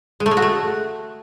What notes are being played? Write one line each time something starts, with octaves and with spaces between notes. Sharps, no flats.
G#3
A3
G#3
F#4
A3